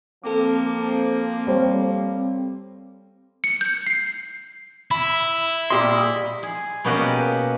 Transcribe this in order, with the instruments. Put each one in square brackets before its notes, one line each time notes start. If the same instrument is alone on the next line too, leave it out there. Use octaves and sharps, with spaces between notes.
[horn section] F3 A#3 [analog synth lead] C4 [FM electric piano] A4 D6
[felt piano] G3 C5 C#5
[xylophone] C#7
G6
C7
[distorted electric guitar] E4 [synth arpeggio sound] B5
[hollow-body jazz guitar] A#2 G4 C6 [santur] G3 D#5
[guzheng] G#4
B2 A#3 C#4 G4 D#5 F#5